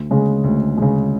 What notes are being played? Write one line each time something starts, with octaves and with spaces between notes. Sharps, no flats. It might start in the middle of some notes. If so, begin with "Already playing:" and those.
Already playing: D2
C#3 G#3
D2
C#3 G#3